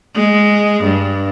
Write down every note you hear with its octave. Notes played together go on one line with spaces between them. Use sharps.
G#3
G2